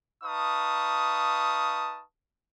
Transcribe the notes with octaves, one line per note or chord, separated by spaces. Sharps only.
D#4 B4 F5 A5 C#6 D#6